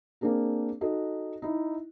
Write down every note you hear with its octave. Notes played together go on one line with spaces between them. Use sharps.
A#3 C4 D4 G#4 A#4
D#4 F#4 A4 D#5
D#4 E4